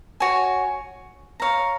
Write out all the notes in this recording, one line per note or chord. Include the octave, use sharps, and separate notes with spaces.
F#4 C#5 G#5
C#5 F5 A#5